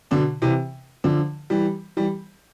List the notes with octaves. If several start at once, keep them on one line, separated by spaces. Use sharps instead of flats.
B2 D3
C3 E3
D3 F3
E3 G3
E3 G3